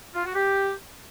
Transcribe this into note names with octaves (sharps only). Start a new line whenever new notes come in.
F4
F#4
G4